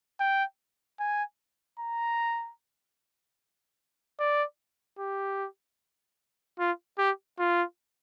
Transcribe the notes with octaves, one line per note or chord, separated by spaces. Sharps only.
G5
G#5
A#5
D5
G4
F4
G4
F4